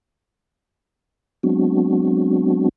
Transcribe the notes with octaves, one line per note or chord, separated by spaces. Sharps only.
F#3 G#3 B3 C4 D4 F#4